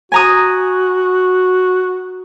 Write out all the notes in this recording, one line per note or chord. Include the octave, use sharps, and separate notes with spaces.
F#4 G#5 A#5 D#6